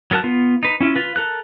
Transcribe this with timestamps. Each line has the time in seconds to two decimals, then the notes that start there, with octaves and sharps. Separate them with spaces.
0.11 F#3 B3 A#4 A5 F#6
0.24 B3 F4
0.63 D#4 B4
0.80 C#4 E4 F4
0.95 F4 B4
1.16 A4 A#4 F#6